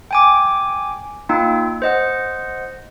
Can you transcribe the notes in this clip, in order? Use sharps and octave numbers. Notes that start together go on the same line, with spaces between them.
G5 G#5 D6
A#3 D#4 F4 G5
C5 D#5 F#5